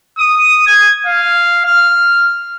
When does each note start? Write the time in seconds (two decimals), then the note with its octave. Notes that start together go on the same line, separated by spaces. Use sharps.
0.19 D#6
0.67 G#6
1.07 F5
1.66 F6